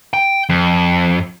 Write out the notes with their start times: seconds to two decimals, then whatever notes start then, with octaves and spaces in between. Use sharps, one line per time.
0.13 G5
0.49 F2